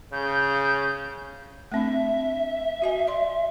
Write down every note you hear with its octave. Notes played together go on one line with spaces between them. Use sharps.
C#3 G6
A3 C4 D4 E5
F#4 D#5 G#5
D5 C6